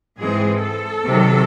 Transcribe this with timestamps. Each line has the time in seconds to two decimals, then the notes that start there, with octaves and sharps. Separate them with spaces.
0.19 G#2 E3 G#3 C4 G#4
0.62 A4
1.05 C3 D#3 F#3